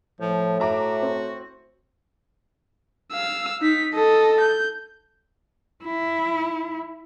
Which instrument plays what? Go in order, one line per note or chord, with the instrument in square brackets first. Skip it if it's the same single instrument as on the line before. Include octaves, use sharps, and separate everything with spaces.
[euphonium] A2 [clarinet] F3
[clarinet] F#4 [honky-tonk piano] E5 A#5 D6
[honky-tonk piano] C4
[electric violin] F5 E6
D#4 B6
A4 D#5
G6
[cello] E4